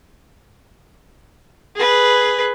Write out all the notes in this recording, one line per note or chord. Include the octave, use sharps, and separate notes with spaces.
G#4 B4